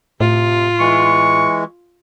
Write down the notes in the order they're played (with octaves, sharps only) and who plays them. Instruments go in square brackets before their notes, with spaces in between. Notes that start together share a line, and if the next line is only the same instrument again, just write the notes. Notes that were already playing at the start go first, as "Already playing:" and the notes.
[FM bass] A2 [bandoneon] C3 [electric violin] F4
[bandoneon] E3 G#3 [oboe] C#6